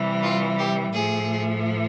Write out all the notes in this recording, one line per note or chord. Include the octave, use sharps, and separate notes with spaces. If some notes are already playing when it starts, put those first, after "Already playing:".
Already playing: C3 E3 G3
F4
G4
A2 F3 A3 G#4